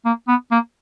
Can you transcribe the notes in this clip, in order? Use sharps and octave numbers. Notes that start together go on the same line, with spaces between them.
A#3
B3
A#3